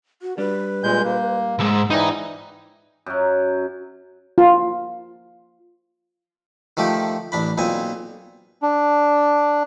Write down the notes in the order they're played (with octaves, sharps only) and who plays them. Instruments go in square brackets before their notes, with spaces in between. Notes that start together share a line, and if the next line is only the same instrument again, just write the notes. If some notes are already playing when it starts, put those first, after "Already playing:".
[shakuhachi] F#4
[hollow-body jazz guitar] G3 D4 [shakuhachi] B4
[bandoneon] A#2 G#3 G6
A#3
[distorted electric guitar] C2 G#2 [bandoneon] E6
[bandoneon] G#2 E3 E4 [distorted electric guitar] D#4 [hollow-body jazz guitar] D5 B5 [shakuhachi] G5
[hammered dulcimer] F#2 F#3
[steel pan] F4
[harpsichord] D#3 F3 A3 G4
A1 D4 B5
B1 A#2 C4 G#5
[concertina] D4